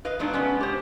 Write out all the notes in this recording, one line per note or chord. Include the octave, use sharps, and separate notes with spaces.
B4 D#5 F5
F#3 G#3 B3 D4 D#4
G#3 B3 C#4
G4 C5